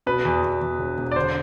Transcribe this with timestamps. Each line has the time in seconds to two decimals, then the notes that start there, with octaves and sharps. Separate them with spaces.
0.06 B2 B4
0.25 E2
0.42 E2
0.61 E2
0.79 E1
0.98 E1
1.12 D5
1.16 D3 C5